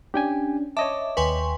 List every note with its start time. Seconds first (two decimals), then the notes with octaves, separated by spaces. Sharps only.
0.14 C#4 D4 G4 G5 G#5
0.77 C#5 D#5 E5 A5 D6
1.17 D#2 B4 G5 G#5 C6 C#6